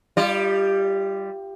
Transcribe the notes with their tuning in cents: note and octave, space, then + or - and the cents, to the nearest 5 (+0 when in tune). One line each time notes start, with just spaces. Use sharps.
G3 +0 F4 -30 D#5 -40